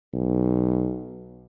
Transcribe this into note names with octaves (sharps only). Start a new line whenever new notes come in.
B1